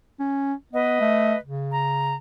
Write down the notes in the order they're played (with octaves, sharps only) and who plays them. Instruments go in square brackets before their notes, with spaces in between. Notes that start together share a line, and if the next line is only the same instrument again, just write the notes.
[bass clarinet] C#4
[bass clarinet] B3 [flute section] B4 D#5
[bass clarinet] A3
C#3
[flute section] A#5